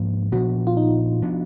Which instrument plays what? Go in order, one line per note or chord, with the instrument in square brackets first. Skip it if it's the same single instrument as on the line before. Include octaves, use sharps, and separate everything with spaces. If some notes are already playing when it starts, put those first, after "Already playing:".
Already playing: [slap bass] G#2 F3 A#3 D4
[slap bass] A#2 F3 B3 D4 [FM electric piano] F#4
[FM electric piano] F4
D#4
[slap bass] F3 B3 D4